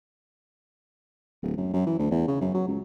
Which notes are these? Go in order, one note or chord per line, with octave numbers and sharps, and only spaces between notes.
D1
F#2
F#2
E3
D2
E2
C#3
F#2
F#3
C#2